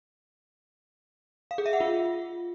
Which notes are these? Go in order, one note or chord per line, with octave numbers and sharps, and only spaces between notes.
F5
G#4
E5
F#5
F4